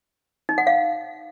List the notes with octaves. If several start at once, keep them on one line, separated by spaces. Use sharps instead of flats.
D#4
F#5
F5